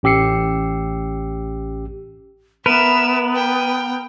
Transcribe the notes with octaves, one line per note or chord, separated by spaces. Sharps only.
A1 C#4 G4 E6 C7 C#7
B3 A#4 B4 E5 E7
G5